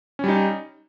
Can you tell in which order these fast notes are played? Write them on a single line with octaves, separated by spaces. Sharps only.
C#4 G3 D#4